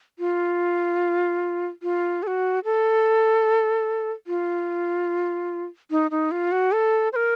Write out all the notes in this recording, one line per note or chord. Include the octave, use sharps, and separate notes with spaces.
F4
F4
A4
F#4
A4
F4
D#4
D#4
F4
F#4
A4
C5
A#4